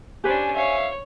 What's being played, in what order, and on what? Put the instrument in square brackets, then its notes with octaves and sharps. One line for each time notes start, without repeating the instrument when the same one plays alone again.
[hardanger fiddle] C#4 D4 [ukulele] G4 B4 C5 [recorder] G#5
[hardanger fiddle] C#5 [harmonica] E5 F5